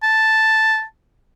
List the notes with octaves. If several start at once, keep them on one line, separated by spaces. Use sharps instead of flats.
A5